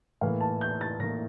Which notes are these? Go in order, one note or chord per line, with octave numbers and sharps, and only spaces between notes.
A2 E3 A#3 F5
A5
G6
A6
A2 E3 A#3 A#6